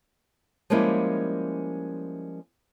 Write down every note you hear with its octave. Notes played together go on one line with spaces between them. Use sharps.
F3 G3 G#3 A#3 C#4 E4